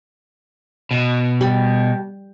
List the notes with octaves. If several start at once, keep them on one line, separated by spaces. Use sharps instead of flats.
B2
G3